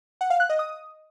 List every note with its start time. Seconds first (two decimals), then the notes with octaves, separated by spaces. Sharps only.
0.21 F#5
0.30 F5
0.40 F#6
0.49 D#5
0.59 D#6